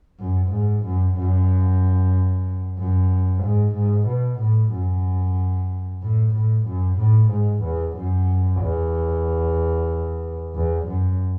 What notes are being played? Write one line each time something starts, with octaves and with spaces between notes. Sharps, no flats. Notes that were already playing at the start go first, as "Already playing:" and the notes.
F#2
G#2
F#2
F#2
F#2
G#2
G#2
B2
A2
F#2
A2
A2
F#2
A2
G#2
E2
F#2
E2
E2
F#2